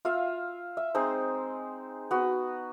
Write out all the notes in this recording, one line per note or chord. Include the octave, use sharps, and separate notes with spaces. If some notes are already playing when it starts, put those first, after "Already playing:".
F4 E5 F5
E5
G#3 C4 D#4 C5
B3 F#4